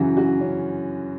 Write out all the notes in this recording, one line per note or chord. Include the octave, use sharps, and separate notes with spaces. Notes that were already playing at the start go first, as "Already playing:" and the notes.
Already playing: F#2 C#3 E3 E4 F#4
F#4
C#4